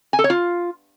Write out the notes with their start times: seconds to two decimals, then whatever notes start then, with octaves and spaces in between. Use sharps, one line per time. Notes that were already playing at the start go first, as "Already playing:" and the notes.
0.13 G#5
0.19 A4
0.24 C#5
0.30 F4